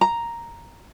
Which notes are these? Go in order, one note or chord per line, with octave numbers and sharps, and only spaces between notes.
A#5